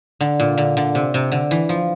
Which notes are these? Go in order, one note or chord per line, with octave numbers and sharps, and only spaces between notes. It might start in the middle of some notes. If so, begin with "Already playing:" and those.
D3
A#2
D3
D3
C3
C3
D3
E3
F3